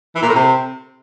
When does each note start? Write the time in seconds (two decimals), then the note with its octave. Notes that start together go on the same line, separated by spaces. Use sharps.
0.15 E3
0.22 A#2
0.28 A2
0.35 C3